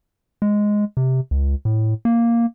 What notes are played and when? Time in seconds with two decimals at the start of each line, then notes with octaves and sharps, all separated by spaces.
0.42 G#3
0.97 C3
1.31 C#2
1.65 A2
2.05 A#3